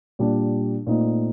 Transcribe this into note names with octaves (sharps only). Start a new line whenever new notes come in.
A#2 G3 D4
A#2 A3 C4 D#4